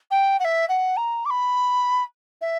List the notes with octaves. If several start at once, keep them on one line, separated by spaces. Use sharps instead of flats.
G5
F#5
E5
F#5
A#5
D6
B5
E5